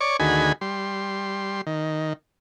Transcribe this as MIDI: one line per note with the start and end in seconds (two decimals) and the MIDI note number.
0.01 0.17 73
0.01 0.17 74
0.01 0.17 85
0.01 0.17 86
0.20 0.52 38
0.20 0.52 51
0.20 0.52 66
0.20 0.52 68
0.20 0.52 80
0.20 0.52 83
0.61 1.61 55
0.61 1.61 84
1.67 2.13 51